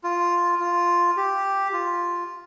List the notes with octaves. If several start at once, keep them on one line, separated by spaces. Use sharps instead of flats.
F4
F4
G4
F4